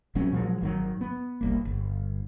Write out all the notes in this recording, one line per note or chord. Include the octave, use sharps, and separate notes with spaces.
A#1 F#3 C4 C#4
A#2 F3 F#3 G#3
G#1 D#3 F#3
B3
F1 C2 A#3
G1